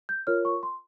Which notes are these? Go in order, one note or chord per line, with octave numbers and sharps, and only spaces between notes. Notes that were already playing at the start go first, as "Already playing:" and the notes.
G6
F4 A#4 C#5 F6
C#6
C6